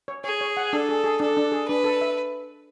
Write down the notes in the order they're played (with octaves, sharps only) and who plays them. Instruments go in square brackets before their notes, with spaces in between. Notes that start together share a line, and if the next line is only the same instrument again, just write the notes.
[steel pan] C#5
[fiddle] G#4 [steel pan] C#5
[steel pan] C#5
F#5
[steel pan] D4 [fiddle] A4
[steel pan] G#4
G#4
[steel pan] D4 [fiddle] A4
[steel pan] D4
G#4
[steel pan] D4 [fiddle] B4
[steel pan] A4
E5